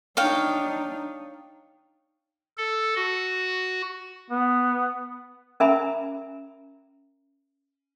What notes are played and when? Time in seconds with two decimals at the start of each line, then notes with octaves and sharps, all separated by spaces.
0.17 D4 D#4 C#5 F5 G5
2.57 A4
2.96 F#4
4.30 B3
5.60 C#4 A#4 E5 G#5 A#5 B5